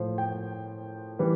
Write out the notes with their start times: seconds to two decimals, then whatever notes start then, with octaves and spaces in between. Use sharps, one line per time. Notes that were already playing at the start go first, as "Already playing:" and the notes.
Already playing: A2 F3 C5
0.18 G5
1.19 E3 G3 B4